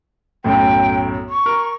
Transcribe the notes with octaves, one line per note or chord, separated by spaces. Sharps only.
B1 F#2 A2 G5
C#6
A#4